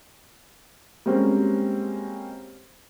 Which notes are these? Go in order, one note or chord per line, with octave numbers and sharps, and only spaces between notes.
G3 G#3 A#3 C4 C#4 F#4